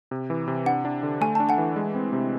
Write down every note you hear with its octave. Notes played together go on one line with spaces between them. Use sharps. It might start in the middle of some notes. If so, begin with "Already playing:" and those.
C3
E3
C3
D4 F#5
D4
D3
A3 G#5
D4 A5
F#5 G#5
E3
G#3
C4
C3